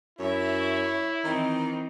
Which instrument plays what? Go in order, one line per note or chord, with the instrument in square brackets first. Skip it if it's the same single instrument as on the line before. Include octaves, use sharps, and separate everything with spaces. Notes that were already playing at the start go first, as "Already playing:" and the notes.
[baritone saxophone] F#2 [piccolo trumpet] E4 [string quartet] C#5 E5
[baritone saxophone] D#3 [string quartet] E3 C4 D#4